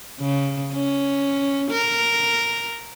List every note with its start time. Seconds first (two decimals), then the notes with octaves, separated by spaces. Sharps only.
0.20 C#3
0.74 C#4
1.71 A#4